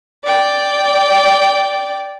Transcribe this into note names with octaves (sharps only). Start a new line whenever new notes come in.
D5 G5